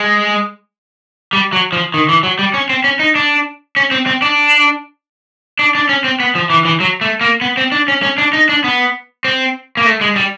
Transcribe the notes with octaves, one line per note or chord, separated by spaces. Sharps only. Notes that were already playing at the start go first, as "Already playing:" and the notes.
Already playing: G#3
G3
F#3
F3
D#3
E3
F#3
G3
C#4
C4
C#4
D#4
D4
C#4
C4
C4
D4
D4
D4
C#4
C4
B3
F3
E3
E3
F#3
A3
A#3
B3
C4
D4
C#4
C#4
D4
D#4
D4
B3
C4
A#3
A3
G#3
G3